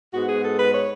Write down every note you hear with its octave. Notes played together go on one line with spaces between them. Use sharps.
G#2 G#3 B3 F#4
G#4
A4
B4
C#5